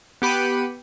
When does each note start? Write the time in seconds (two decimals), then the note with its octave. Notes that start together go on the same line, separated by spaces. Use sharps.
0.22 B3 G4 B5 C#7 D#7